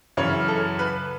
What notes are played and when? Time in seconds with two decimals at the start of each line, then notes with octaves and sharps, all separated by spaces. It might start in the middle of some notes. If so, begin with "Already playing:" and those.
0.17 F#2 C#3 E3 C#5
0.48 A4
0.79 B4